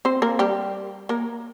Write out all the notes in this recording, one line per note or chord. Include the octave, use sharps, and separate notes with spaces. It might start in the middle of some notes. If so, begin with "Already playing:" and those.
C4 C5
A#3 A#4
G3 G4
A#3 A#4